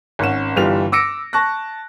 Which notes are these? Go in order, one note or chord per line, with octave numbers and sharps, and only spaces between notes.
G#1 C#4 F#5 E7
G1 E3 G3 F4 F7
D6 E6 A#6 C#7 D7
A5 C#6 F#6 A#6